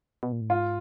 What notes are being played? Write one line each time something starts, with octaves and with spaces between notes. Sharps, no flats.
B2
A#2
A2
G#2 F4